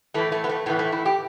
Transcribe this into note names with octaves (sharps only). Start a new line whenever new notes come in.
A2 E3 A3
A3
B3
A3
A2 E3 B3
A3
E4
G4